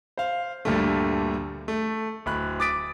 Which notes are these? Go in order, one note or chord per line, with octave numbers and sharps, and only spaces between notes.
C5 F5
D2 G2 A#2 G3 A3
A3
D1 B5 F#6
D6 D#6 A6 B6 D7